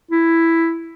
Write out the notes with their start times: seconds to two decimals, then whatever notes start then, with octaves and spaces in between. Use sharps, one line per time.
0.11 E4